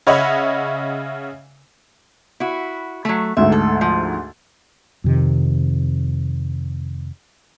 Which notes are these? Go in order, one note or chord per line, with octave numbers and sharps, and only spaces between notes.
C#3 C#5 D#5 E5 F#5 B5
E4 F#4
F#3 A3
D2 G#2 A3 E5
A4
F3
F2 C3 D#3